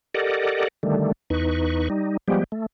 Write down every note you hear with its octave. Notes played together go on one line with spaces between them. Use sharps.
G4 A4 A#4 D5 D#5 F#5
D3 D#3 G3 A3
E2 D#4 B4 C#6
G3 D#4
F3 G3 G#3 B3 G4
A3